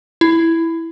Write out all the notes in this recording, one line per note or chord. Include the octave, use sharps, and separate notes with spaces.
E4